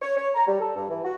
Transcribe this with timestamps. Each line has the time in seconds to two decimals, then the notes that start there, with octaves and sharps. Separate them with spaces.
0.02 C#5
0.17 C#5
0.35 A#5
0.47 G3
0.59 A4
0.75 G2
0.89 E3
1.04 F#4